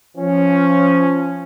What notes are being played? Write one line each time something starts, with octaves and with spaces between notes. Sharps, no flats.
F3 C#4